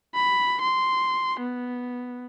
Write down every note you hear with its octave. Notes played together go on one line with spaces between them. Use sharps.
B5
C6
B3